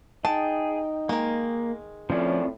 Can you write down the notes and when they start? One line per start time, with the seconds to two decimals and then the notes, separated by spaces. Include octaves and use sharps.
0.25 D#4 G#4 G5 A5
1.09 D#3 G#3 A#3
2.10 A2 F3 C4 C#4 F4 D5